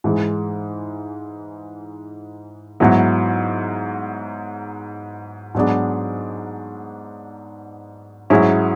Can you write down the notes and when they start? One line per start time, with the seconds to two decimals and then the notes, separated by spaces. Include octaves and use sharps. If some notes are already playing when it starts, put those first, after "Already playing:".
0.04 G#2 E3 G#3
2.80 G#2 F#3 B3 E4
5.55 G#2 F#3 B3 D4 G#4
8.30 G#2 F#3 C#4 E4 G#4